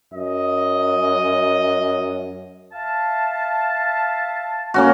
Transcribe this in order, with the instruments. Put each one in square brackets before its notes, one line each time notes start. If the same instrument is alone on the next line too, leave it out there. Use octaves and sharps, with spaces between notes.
[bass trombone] F#2 [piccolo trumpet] D#5
[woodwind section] E5 F5 A5
[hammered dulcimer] A#3 C#4 F#4